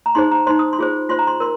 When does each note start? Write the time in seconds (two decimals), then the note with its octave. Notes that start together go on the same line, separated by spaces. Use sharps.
0.06 A#5
0.15 D#4 G#4 C5 C6
0.31 A#5
0.47 D#4 C5 C6
0.59 D#6
0.73 C6
0.79 F4 G#4 C5
1.09 F4 C5 C6
1.19 A#5
1.27 C6
1.40 A#4 C6